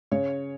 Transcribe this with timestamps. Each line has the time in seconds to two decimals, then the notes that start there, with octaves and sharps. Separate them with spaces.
0.11 C#3 C#5